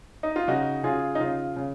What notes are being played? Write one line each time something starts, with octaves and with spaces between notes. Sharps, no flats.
D#4
F4
C#3 D#4 F#4
C#3 F4 G#4
D#4
C#3 F4
C#3